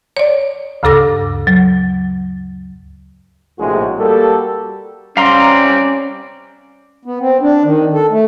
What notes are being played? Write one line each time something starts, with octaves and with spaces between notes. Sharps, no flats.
C#5 D5
D2 G2 C#3 A4 D6 A#6
F#3
A#1 A2 C3 G#3 F#4 G#4
G3 A#3 F#4 G4 A4
G3 C4 C#4 D5 F5 A#5 C6
B3
C4
D4
D#3
A4
A3